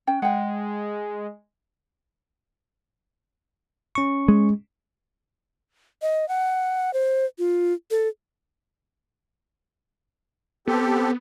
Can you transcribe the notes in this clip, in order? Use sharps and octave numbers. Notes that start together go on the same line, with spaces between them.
C#4 G5
G#3 F#5 G5
C#4 C#6
G#3
D#5
F#5
C5
F4
A4
B3 C4 G4 A4